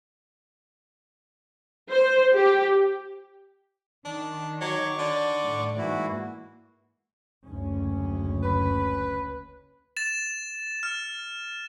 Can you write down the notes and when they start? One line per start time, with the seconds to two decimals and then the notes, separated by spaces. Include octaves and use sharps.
1.89 C5
2.35 G4
4.05 D#3 D4
4.61 F#3 C#6 D6
4.99 D3 D5
5.43 A2
5.78 G#2 E3 A#3 E4 F#4
7.45 F#1 D2 C#4
8.43 B4
9.97 A6 E7
10.83 F6